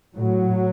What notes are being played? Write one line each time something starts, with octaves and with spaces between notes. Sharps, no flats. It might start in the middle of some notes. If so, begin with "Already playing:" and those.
A2 F#3